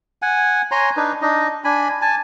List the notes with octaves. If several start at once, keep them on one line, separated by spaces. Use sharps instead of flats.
F#5 G#5
C#5 G#5 A#5 C6
D4 D#4 B4
D4 D#4 D#5
D4 G#5 B5
G#5 A5